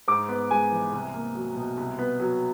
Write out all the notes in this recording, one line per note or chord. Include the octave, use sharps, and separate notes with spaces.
G#2 D6
B3
G#3 G#5
E3
C2
A#3
F#3
B2
C2
B3
F#3